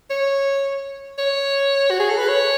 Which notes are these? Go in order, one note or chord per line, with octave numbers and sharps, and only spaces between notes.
C#5
C#5
F#4
G#4
A4
B4
C#5